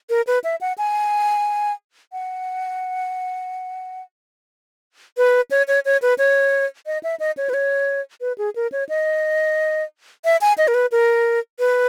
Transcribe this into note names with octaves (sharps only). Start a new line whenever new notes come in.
A#4
B4
E5
F#5
G#5
F#5
B4
C#5
C#5
C#5
B4
C#5
D#5
E5
D#5
C#5
B4
C#5
B4
G#4
A#4
C#5
D#5
E5
G#5
D#5
A#4
B4
A#4
B4